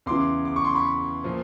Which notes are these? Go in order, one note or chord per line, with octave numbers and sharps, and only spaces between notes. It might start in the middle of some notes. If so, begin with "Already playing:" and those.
E2 C#3 E3 C6 D6
D6
C#6
C6
B5 C#6
A#2 F3